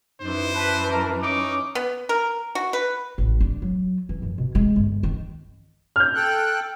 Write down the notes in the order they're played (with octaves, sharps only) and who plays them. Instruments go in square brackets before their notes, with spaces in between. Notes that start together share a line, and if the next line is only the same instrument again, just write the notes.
[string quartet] F#2 E3 [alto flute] D#4 [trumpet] C5
[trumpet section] B4 [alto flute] A5
[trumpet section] A#4
[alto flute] C#4 [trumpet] D#4 [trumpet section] D6
[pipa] B3
A#4
F#4
B4
[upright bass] A1
D4
F#3
E3
F#2
B2
G#3
G1
D#3
[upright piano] F6 G6
[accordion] A4 G5 F#6